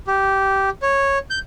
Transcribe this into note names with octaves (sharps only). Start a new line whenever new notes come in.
G4
C#5
G6